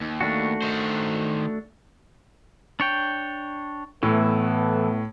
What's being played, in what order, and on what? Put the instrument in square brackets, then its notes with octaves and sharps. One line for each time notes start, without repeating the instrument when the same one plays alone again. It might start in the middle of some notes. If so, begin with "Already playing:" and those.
[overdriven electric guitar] D#2
[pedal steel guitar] A3 D4 F#4
[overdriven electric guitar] D#3 C5
[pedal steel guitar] D4 C#5 G5
[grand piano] A2 [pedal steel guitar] E3 [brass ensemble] A3 B3